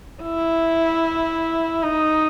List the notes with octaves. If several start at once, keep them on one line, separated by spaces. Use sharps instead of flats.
E4
D#4